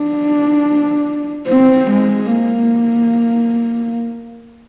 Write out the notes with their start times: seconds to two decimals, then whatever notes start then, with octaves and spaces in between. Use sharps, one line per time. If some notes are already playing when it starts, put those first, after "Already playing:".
Already playing: D4
1.47 C4
1.91 G#3
2.35 A#3